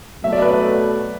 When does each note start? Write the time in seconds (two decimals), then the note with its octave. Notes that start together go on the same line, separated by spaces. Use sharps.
0.24 B2 F#3 A3 E5
0.33 D5
0.42 B4
0.51 D5